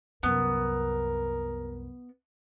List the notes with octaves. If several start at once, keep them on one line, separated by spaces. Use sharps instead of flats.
C2 F#2 B3 A#4